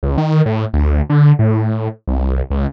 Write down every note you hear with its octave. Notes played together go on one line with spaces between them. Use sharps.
C#2
D#3
A2
D2
D3
A2
C2
C#2